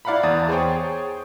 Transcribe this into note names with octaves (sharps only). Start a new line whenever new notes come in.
E4 D5 F5 F#5 A#5 B5
E2 D5 A5 A#5 D#6 A6
G#4 C5 C#5 G5